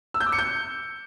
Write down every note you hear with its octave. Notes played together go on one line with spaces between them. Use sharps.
E6
G6
D6
C#7
G6